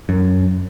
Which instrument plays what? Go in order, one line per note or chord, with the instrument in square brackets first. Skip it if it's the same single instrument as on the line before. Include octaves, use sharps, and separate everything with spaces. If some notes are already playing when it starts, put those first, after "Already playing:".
[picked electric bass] F#2